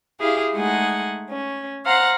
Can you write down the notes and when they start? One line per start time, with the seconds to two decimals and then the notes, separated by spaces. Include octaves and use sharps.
0.20 E4 G4 G#4 F5
0.53 G#3 A3 D#4 F#5 G#5
1.31 C#4
1.84 C5 F5 F#5 A#5